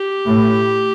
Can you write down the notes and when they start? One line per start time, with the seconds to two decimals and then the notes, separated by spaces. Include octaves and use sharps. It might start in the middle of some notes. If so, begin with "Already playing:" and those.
Already playing: G4
0.26 A2